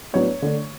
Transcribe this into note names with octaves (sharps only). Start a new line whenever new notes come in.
A2 F#3 B3 D4 C#5
D3 A3 D4